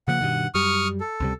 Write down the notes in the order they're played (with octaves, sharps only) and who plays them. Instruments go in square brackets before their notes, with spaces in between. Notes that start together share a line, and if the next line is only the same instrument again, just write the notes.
[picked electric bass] C#3 F3 A#3 [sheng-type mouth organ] F#5
[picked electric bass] G2 B2 D#3
[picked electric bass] F#2 G3 [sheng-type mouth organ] C#6 D#6 F6
[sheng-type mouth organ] A4
[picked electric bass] C#2 C3 G3